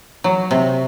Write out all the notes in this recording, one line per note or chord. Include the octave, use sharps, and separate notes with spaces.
F#3
C3